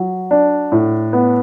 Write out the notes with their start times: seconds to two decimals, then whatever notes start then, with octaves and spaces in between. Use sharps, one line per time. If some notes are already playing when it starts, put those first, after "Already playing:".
Already playing: F#3
0.31 D4
0.72 A2
1.13 B3